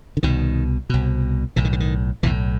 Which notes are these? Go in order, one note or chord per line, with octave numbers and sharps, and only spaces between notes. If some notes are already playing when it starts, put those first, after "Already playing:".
D3
C2 B2 D#3
C2 B2
B1 A2 E3
D#3
D3
D#3
B1 E2 A2 E3